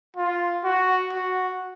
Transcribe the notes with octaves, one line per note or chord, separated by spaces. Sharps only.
F4
F#4
F#4